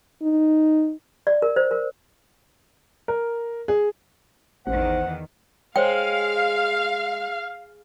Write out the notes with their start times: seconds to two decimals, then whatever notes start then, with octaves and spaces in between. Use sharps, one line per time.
0.22 D#4
1.27 D5
1.42 A#4
1.56 C5
1.71 A#4
3.08 A#4
3.68 G#4
4.67 A1 E2 D#3 C5 F#5
5.76 G#3 C5 C#5 F5 G5